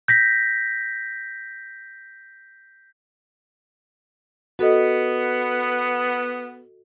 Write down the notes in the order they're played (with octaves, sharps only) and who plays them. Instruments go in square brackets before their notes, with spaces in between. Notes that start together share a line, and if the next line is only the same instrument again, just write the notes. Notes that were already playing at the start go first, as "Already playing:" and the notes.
[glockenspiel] G6 A#6 B6
[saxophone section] B3 [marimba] F#4 A4 D#5